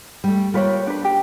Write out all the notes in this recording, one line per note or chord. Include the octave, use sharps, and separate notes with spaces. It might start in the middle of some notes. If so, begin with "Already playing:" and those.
G3 A3
G3 A#3 F4 B4 C#5
D4 B4
G4